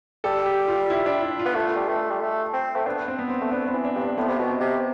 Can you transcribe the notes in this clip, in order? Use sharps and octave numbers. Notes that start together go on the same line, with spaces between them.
G3 A4
G4
F4
E4
D4
E4
F4
B3
A3
G3
A3
G3
A3
C4
A3
B3 D4
C4
B3
C4
A3
B3 D4
C4
E3
D4
G2
C4
A2 B3
C3
B2
C4
C3